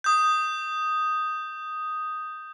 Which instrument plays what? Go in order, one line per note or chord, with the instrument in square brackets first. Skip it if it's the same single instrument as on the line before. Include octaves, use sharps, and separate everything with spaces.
[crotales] D#6 G6